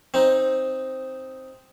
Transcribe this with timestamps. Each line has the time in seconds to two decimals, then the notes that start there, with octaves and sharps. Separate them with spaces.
0.14 C4 D#4